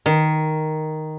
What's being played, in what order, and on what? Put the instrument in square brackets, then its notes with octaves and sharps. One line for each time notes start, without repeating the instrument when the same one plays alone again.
[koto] D#3